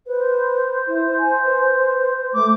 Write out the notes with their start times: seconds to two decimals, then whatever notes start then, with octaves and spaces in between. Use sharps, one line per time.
0.07 B4 C5
0.87 E4
1.19 G#5
1.45 B4
2.33 A3 D6